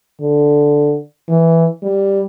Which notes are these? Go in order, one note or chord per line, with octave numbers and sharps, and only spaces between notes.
D3
E3
G3